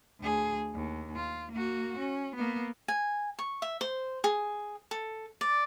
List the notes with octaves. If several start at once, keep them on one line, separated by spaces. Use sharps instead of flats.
D2 G#4
D#2
F4
A#3 F#4
C#4
A#3 B3
G#5
C#6
E5
C5
G#4
A4
D5